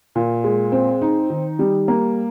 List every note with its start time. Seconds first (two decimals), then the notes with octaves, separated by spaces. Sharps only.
0.15 A#2
0.44 G#3
0.72 C4
1.02 D#4
1.30 D#3
1.59 G3
1.88 A#3